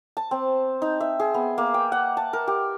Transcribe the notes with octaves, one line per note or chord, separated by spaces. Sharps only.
A5
C4
D#4
E5
G#4
B3
A#3
G5
F#5
A5
A#4
G4